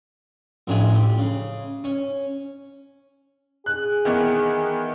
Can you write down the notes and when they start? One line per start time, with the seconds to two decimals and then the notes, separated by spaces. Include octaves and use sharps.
0.67 A1 F2 A2 F3 D4 G#5
0.94 G4
1.18 C#3
1.84 C#4
3.66 G#4 F#6
4.05 D#3 E3 B3